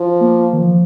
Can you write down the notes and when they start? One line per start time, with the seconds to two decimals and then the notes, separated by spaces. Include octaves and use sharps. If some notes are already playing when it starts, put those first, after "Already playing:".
Already playing: F3
0.21 A#3
0.53 D#3
0.59 F3